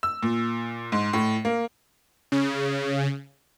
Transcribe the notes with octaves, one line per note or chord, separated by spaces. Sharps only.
E6
A#2
G#2
A2
A#3
C#3